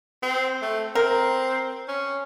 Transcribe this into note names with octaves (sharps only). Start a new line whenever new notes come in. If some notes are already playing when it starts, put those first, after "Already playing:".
C4
A3
C4 A#4
C#4